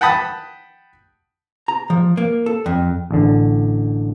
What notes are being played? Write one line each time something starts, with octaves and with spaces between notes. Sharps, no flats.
F#5 G5 A5 B5 D#6
A#5
F3
A#3
A4
F2
A1 D3